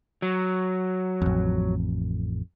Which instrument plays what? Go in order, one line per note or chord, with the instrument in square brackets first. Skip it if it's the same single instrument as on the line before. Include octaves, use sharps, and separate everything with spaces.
[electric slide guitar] F#3
[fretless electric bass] A1 F2